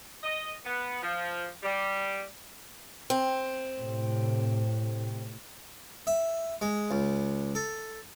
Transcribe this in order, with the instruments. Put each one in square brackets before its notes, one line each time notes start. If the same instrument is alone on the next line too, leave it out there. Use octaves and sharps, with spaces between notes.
[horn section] D#5
B3
F3
G3
[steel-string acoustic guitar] C4
[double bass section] A2 C3
[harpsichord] E5
G#3
C#2
A4